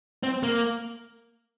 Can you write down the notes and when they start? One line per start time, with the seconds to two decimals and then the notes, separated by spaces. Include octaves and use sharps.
0.23 C4
0.43 A#3